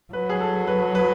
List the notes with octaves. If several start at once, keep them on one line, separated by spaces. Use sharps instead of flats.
F#3 B4
G#4
A4
B4
B4